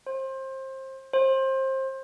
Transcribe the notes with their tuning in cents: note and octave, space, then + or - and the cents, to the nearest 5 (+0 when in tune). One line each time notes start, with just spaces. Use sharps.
C5 +25
C5 +25